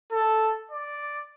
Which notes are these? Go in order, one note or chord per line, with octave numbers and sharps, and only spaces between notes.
A4
D5